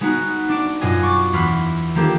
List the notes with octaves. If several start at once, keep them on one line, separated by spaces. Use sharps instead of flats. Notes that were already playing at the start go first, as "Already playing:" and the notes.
G#3 B3 D#4 F#4
D4 D5 D7
F#2 B2 F4 D#5 G#5
C#6 D6 A6
E2 B5 C6 F6
D#3 F3 A#3 D4 G4 A4